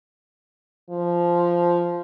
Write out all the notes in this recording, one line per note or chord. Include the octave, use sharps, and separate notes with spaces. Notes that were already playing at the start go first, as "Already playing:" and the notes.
F3